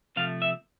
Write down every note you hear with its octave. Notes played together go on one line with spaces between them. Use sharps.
C3 F3 A3 F5
E5